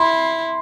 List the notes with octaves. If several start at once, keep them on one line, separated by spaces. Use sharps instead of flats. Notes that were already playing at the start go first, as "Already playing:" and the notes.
Already playing: E4 C6